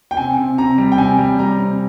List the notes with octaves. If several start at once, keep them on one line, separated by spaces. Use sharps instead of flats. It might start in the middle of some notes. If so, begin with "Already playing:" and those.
G5
C3 G#5
C3
C3 A#5
G3
G5
C3 G#5
G3
G3 A#5
C3